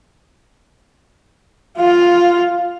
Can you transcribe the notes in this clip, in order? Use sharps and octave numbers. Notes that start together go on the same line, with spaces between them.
F4 F5